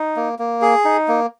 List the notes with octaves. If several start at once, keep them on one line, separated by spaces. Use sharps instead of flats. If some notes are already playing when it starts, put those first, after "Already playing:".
Already playing: D#4
A#3
A#3
G#4
D#4
A#3